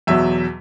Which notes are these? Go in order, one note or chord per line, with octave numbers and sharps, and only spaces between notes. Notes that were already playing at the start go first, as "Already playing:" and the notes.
E2 B2 F#3 E5